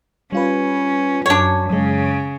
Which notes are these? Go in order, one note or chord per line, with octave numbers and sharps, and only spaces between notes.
G3 C#4 F4 B4
F#2 D4 C#5
F#2 C#3 G#3